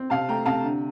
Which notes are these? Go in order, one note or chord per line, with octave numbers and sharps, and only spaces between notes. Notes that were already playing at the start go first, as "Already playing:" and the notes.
Already playing: C4
C3 F5 A5
A3 G5 A#5
C3 F5 A5
D3